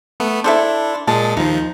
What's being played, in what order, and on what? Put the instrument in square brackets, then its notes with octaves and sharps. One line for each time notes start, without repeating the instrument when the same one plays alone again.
[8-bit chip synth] A3 B3
[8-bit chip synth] D4 [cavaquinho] E4 A4 C5
[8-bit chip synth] A#2 G#3 [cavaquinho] A5
[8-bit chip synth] D#2 F3 [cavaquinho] D#4